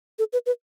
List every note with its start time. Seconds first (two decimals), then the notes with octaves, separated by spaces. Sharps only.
0.19 A4
0.33 B4
0.46 B4